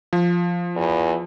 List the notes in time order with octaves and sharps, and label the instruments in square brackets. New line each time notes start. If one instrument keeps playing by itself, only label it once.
[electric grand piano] F3
[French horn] E2